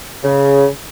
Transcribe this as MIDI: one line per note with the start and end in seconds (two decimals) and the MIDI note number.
0.23 0.67 49